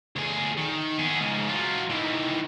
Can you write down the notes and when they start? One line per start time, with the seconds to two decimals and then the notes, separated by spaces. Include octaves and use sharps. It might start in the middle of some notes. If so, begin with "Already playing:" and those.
0.16 D2 G#4
0.58 D#3
0.99 B3 G#4
1.20 G#2 C#3
1.49 F#3 F4
1.90 D#3 E3